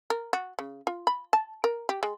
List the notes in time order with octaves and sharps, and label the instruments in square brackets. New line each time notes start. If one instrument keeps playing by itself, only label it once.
[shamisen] A#4
F#4
C#3
F4
B5
A5
A#4
G4
G#3